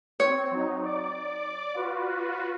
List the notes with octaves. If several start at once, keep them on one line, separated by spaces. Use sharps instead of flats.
C4 C#5
F#3 D#4
D5 D6
F4 F#4 B4